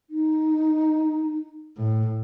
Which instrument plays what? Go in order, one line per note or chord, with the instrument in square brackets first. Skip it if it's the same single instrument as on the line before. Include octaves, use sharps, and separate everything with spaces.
[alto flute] D#4
[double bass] A2